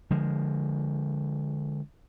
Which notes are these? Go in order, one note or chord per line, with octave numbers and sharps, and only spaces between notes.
D3 F3 G#3